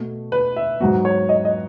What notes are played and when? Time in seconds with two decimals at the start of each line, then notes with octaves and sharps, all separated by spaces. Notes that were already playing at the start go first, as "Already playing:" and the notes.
Already playing: B2 A3
0.32 B4
0.56 E5
0.80 G#2 F#3 B3 F#4
1.05 C#5
1.29 D#5
1.45 D#5